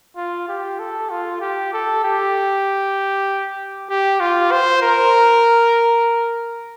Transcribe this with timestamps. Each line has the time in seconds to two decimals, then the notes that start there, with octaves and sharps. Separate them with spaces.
0.17 F4
0.49 G4
0.79 A4
1.10 F4
1.41 G4
1.73 A4
2.04 G4
3.90 G4
4.20 F4
4.52 C5
4.83 A#4